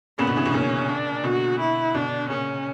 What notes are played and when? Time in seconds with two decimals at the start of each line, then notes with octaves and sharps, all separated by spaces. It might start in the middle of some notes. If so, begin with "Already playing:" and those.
0.18 A#2 C#3 B3
0.27 B2 D3
0.37 C#3 E3
0.45 B2 D3
0.54 A#2 C#3 C#4
0.89 D4
1.24 B2 D3 F#4
1.60 E4
1.94 B2 D3 D4
2.29 A#2 C#3 C#4